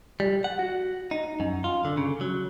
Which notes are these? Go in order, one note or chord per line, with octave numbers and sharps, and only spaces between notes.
G3
F#5
F#4
D#4
F#2
F4
D3
C#3
F#3